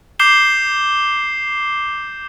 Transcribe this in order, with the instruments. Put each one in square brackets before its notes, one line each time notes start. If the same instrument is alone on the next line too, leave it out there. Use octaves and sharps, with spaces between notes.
[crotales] D6 G6 C7 E7 G7